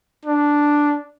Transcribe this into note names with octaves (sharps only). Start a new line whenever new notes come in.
D4